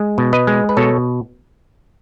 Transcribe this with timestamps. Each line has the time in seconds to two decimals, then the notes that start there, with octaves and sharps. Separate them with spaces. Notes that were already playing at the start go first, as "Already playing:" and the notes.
Already playing: G#3
0.18 B2
0.33 B4 D#5
0.47 G#3
0.69 B4
0.77 B2 A4 C#5